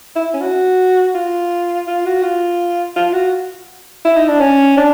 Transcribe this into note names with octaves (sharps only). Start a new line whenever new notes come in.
E4
C#4
F#4
F4
F4
F#4
F4
F4
F#4
E4
D#4
D4
C#4
D4